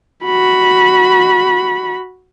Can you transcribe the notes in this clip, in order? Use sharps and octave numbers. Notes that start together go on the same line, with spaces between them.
F#4 B5